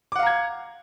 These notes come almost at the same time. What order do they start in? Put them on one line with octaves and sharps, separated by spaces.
D6 F#5 F5 A#5 G#6